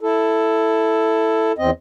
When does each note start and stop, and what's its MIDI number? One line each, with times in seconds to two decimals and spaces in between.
0.01 1.52 64
0.01 1.52 69
1.58 1.71 40
1.58 1.71 60
1.58 1.71 75